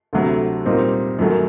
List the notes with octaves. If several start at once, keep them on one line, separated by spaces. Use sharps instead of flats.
D2 C3 F#3 A3
A#2 G3 C4 D#4
F#2 D#3 F#3 A3